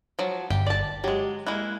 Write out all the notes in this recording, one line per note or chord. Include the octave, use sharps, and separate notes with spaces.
F3 F#3
G1 G4
D5 A5
F#3 G#3 G4
G#3 A#3 E4 F#6